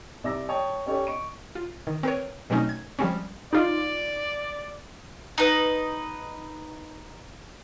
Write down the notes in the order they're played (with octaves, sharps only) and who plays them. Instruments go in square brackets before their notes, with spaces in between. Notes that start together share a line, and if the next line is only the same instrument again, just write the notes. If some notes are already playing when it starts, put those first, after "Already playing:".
[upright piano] C2 D5 E5 D6 E6 A#6
C#5 G5 A5 D#6
C#4 G4 A4 C#5 D5
D#5 C#6 D7
[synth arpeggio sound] F4
D#3
C4 A#4 B4 C#5
B2 F#3 A3 C4 C#4 D#4
G#6
F3 G3 G#3 C4 C#4
[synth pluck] D#4 F4 [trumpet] D5
[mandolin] D#4 B4